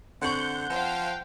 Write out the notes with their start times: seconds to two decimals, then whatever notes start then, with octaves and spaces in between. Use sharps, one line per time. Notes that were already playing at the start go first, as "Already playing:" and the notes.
0.22 D3 C4 F#5 C#6 G6
0.69 F3 C5 F5 G5